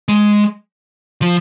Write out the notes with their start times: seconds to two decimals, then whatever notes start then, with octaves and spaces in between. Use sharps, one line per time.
0.08 G#3
1.22 F3